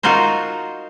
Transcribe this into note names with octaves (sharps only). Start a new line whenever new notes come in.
D#4 F4 F#4 A#4 C5